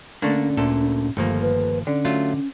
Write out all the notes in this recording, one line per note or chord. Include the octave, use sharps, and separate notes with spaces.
D3 A3 A#3 C#4 D4
D2 A#2 A4
G1 D#2 F3 A3 A#3
B4
D3 C#4
F#3 A3 F4